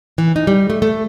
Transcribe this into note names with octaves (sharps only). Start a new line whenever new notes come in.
E3
D#4
G3
A3
A3